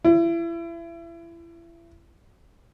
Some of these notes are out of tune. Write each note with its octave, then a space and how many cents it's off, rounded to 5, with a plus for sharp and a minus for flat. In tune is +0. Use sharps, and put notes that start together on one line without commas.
E4 +30